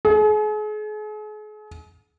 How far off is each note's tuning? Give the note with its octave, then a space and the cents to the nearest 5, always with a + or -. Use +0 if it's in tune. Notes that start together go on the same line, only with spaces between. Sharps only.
G#4 +40